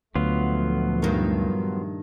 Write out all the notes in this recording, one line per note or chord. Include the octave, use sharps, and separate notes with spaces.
D2 A#2 F3 F#3 A3 B3 F4
G2 D#3